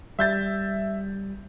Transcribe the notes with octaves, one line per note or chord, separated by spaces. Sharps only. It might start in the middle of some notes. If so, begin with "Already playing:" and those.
G3 E5 G6 A6